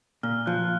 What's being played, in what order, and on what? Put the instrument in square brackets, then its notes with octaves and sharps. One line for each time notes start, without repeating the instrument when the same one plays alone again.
[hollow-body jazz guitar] A#2 [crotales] F6
[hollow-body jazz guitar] F3 [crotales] F#6